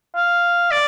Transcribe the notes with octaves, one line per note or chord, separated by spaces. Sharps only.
F5
D5